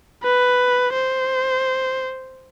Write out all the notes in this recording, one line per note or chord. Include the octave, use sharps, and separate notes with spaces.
B4
C5